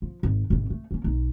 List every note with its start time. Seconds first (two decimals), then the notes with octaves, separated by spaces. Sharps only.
0.02 F3
0.23 G#1
0.50 G#1 C3
0.70 A3
0.91 A#3 C#4
1.04 B1 D#4